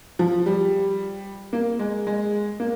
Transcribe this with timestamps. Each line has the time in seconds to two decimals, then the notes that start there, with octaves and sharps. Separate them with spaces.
0.19 F3
0.46 G3
1.53 A#3
1.79 G#3
2.07 G#3
2.60 A#3